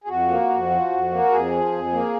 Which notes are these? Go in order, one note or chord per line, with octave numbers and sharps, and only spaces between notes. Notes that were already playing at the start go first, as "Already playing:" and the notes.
G#4
F2 F#4
A#3
F2
F3
F2
A#3
F2 G#4
F3
F2
A#3